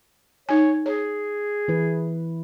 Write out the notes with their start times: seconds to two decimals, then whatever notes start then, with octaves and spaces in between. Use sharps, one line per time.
0.49 D#4 C#5 G#5
0.86 G#4 C#5
1.68 E3 E4 B4